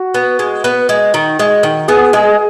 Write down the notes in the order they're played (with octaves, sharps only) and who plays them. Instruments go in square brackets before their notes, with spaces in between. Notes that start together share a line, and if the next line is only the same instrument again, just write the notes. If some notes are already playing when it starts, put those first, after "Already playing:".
Already playing: [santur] F#4
[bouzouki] B3
G#3
B3
G#3
D#3
G#3
D#3
[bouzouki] B3 [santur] G#4
[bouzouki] G#3 [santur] G#4